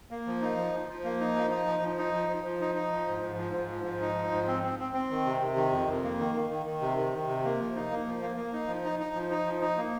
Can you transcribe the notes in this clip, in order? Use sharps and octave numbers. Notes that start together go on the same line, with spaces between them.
A#3
F3
D#4
F3
F3
F3
A#3
D#4
F3
D#4
F3
F3
D#4
F3
F3
F3
D#4
D#4
F3
G#2
G#2
F3
G#2
F3
G#2
D#4
F3
G#2
C4
C4
C4
C4
D#3
C3
C3
D#3
F2
F2
A#3
D#3
D#3
D#3
D#3
C3
D#3
D#3
C3
A#3
F3
D#4
A#3
F3
A#3
A#3
D#4
F3
D#4
D#4
F3
D#4
F3
D#4
A#3